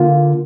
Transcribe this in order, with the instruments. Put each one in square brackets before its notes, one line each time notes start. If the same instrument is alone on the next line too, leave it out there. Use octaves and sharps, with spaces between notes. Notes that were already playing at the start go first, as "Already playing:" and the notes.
Already playing: [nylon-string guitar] D3 A#3 F4